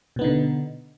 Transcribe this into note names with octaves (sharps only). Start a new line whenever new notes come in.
B2 D3 B3 D#4